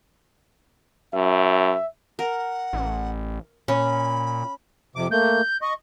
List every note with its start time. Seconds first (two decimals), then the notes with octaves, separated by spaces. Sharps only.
1.14 F#2 E5
2.19 A#4 F#5
2.73 A1
3.68 A#2 C#4 B5
4.96 F2 C3 D6
5.11 A3 A#3 G6
5.62 D#5 C#6